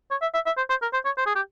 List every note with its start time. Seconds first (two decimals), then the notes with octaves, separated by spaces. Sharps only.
0.11 C#5
0.22 E5
0.34 E5
0.46 E5
0.57 C5
0.69 C5
0.82 A#4
0.93 C5
1.05 C#5
1.18 C5
1.26 G#4
1.36 G4